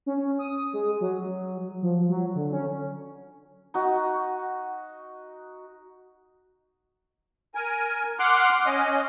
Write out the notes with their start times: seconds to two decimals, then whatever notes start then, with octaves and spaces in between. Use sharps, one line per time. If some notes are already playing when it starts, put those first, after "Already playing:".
0.06 C#4
0.39 D#6
0.73 G#3
1.00 F#3
1.82 F3
2.09 F#3
2.35 D3
2.53 C#4
3.74 D#4 F#4
7.55 A#4 G#5
8.19 F#5 C6 D6 F6 F#6
8.66 C#4 D#5